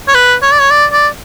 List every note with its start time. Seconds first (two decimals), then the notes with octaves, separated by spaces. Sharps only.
0.08 C#5
0.15 B4
0.42 C#5
0.52 D5
0.60 C#5
0.71 D5
0.93 D5